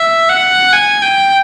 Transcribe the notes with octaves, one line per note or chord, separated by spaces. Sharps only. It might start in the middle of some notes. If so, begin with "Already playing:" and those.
Already playing: E5
F#5
G#5
G5